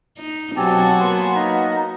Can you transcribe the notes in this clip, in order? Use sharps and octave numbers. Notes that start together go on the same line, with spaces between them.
D#4
B2 F#3 C4 F#4 G4 G#5 A5
A#3 B3 G#5 A5 C6
D#4 A#5